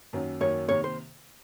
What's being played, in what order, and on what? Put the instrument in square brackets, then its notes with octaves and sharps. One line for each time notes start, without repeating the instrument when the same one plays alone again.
[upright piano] F#2 D#3 F#3 A#3 C#4
[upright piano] F#2 D#3 F#3 A#3 C#4 [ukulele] C#5
[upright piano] C3 D#3 A#3 [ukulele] C#5
[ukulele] C5